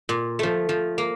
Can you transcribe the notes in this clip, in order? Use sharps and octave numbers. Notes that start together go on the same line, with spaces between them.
A#2
F3 A3
F3
A#3